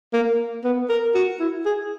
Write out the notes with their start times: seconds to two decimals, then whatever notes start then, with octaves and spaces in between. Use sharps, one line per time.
0.14 A#3
0.64 B3
0.90 A#4
1.15 F#4
1.40 E4
1.66 G#4